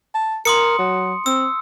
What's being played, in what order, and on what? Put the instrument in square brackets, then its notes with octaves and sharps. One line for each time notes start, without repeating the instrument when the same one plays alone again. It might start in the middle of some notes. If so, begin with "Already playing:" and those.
[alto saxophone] A5
[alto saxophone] A#4 [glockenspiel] C6 D#6 C#7
[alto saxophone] F#3
[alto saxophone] C4 [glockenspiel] E6